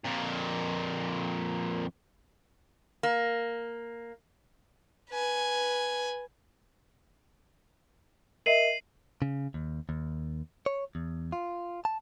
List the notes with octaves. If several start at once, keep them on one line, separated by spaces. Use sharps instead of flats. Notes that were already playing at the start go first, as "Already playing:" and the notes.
F2 A#2
A#3
B4 G#5
A#4 D#5 E5 C7 D#7 F#7
C#3
D#2
D#2
C#5
E2
F4
A5